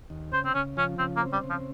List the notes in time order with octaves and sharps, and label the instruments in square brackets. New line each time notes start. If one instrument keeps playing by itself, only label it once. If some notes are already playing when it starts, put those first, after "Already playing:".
[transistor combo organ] D#2
[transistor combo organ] C#3 [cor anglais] C5
[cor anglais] C4
[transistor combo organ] C#3 [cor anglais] C#4
[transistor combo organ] F3 [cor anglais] C#4
[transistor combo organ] C#3 [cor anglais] C4
[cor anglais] A#3
[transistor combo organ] C4
[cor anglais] G3
[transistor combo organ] C#3
[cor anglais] F3